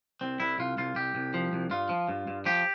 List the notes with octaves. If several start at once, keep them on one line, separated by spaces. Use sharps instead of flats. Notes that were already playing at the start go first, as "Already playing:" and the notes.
C2 C4
C2 E4
C2 F4
C2 F4
C2 G4
C2
F3
C2
G2 F4
F3
G2
G2
F3 G4